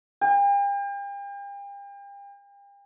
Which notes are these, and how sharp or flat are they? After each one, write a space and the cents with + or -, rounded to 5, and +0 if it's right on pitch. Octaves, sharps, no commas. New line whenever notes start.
G5 +40